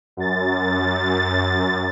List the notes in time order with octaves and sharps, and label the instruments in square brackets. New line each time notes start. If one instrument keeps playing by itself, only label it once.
[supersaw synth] F#2 A6